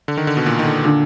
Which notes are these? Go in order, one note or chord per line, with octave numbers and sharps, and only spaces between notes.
D3
D#3
D3
B2
A#2
D#3
D3
A#2 D3